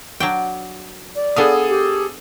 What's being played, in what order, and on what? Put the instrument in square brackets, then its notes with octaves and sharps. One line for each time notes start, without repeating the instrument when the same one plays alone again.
[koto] F#3 D4 G5
[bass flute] D5
[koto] B3 D4 F5 [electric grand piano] G#4 A4 D#6
[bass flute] G4